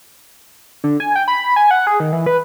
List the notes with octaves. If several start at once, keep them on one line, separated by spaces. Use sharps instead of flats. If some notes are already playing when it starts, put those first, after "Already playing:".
D3
G#5
G5
B5
G#5
F#5
G#4
D#3
E3
B4